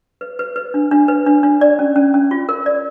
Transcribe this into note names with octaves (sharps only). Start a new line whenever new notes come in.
B4
B4
B4
D4
D4
B4
D4
D4
D5
C#4
C#4
C#4
F4
A#4
D5